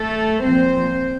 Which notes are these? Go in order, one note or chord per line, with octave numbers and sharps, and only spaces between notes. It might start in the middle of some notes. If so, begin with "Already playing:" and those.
Already playing: A3 A4
A#2 F3 C4 C5